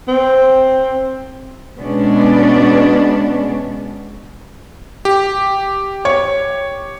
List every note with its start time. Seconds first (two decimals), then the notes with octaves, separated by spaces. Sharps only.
0.08 C4
1.79 B2 G#3 B3 C#4 D4
5.05 G4
6.05 C#5